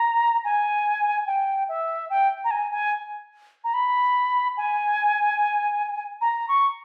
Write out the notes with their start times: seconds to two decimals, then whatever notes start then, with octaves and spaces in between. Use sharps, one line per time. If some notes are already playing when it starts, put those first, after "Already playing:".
Already playing: A#5
0.45 G#5
1.27 G5
1.68 E5
2.10 G5
2.44 A#5
2.51 G#5
2.71 G#5
3.64 A#5
3.74 B5
4.57 G#5
6.21 A#5
6.48 C#6